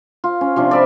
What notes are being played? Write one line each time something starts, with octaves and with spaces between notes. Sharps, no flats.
F4
C#4
C3 F3 D4
D5 E5 B5